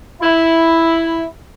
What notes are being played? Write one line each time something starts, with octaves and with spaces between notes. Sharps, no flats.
E4